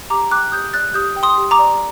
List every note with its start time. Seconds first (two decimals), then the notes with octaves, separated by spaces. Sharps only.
0.10 G4 A#5 D6
0.31 G5 D6 F#6
0.52 G4 D#6 G6
0.73 D5 F#6 A6
0.94 G4 D#6 G6
1.16 G5
1.23 C6 D#6
1.38 G4
1.51 A#5 D6
1.59 D5